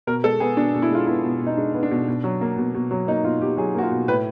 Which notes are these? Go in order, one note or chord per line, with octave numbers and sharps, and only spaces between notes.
B2 A#4
G#3 A4
B3 G#4
B2 D4
B2
E4
G#3 F4
B3 E4
B2
B2
D#4
G#3 D4
B3
D4
B2
B2
F#3
A#3
B2
B2
F#3
A#3 D#4
B2 F4
B2 G4
F#3 G#4
A#3 F#4
F4
B2
A2 B4